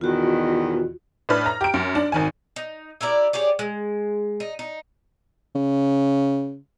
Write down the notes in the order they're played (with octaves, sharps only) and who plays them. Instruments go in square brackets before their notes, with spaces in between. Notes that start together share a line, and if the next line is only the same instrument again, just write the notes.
[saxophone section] E2 B2 D#3 [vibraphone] F4 F#4
[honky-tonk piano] A2 D4 B4 F6
A#5
G4 D7
F#2
D4
G#1 D#3 G#5
[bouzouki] D#4
E4 G4 A#4 D5
G4 G#4 C#5 D5
G#3
D#4
D#4
[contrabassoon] C#3